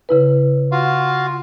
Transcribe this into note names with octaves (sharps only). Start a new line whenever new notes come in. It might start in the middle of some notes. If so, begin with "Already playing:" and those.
C#3 E4 B4
F4 F#4 F5